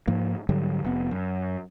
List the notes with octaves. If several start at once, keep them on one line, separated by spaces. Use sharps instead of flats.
G#2 F3 A#3
G#2 D3 F#3 G3
F1 B3
F#2